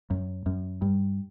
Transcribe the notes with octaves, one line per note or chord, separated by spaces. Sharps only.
F#2
F#2
G2